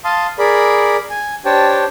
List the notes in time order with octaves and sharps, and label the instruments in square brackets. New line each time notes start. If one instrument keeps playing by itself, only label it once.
[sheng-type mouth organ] F5 A5 C6 D#6
G#4 A#4 D5 B5
G#5
D4 G4 C5 C#5 G5 A5